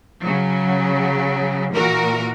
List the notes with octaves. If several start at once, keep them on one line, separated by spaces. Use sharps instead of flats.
C#3 F#3
A#2 E3 F#4 A#4